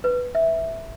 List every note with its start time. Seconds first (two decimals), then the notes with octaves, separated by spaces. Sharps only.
0.04 B4
0.35 E5